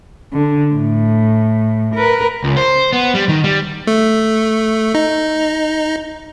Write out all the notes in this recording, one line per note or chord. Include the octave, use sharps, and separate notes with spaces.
D3
A2
A#4 B4
C#2
C5
B3
G3
D#3
G3
A3
D#4